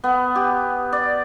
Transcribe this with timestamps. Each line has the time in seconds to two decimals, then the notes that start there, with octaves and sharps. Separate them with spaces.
0.04 B3
0.35 G4
0.93 D5